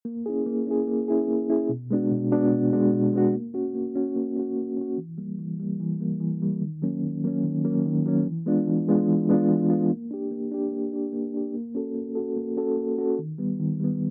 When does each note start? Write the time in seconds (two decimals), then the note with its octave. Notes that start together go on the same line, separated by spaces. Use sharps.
0.05 A#3
0.26 C#4 E4 G#4
0.46 A#3
0.67 C#4 E4 G#4
0.87 A#3
1.08 C#4 E4 G#4
1.28 A#3
1.50 C#4 E4 G#4
1.69 B2
1.91 G#3 B3 D4 F#4
2.11 B2
2.32 G#3 B3 D4 F#4
2.52 B2
2.73 G#3 B3 D4 F#4
2.93 B2
3.13 G#3 B3 D4 F#4
3.33 A#3
3.54 C#4 F#4
3.74 A#3
3.95 C#4 F#4
4.16 A#3
4.36 C#4 F#4
4.57 A#3
4.77 C#4 F#4
4.98 E3
5.18 G3 A#3
5.39 E3
5.60 G3 A#3
5.80 E3
6.01 G3 A#3
6.20 E3
6.42 G3 A#3
6.62 D#3
6.82 F#3 A#3 C#4
7.03 D#3
7.24 F#3 A#3 C#4
7.44 D#3
7.64 F#3 A#3 C#4
7.85 D#3
8.06 F#3 A#3 C#4
8.26 E3
8.46 G#3 B3 D4 F4
8.67 E3
8.88 G#3 B3 D4 F4
9.08 E3
9.29 G#3 B3 D4 F4
9.50 E3
9.70 G#3 B3 D4 F4
9.91 A#3
10.11 D4 G4
10.31 A#3
10.52 D4 G4
10.72 A#3
10.93 D4 G4
11.13 A#3
11.34 D4 G4
11.54 A#3
11.75 C#4 F#4 A4
11.95 A#3
12.15 C#4 F#4 A4
12.37 A#3
12.57 C#4 F#4 A4
12.77 A#3
12.98 C#4 F#4 A4
13.19 D#3
13.38 G3 B3
13.60 D#3
13.80 G3 B3